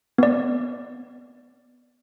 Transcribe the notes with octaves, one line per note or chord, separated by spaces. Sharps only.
B3 D5